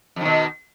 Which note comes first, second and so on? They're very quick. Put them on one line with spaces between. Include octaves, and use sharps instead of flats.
F2 D#3 B2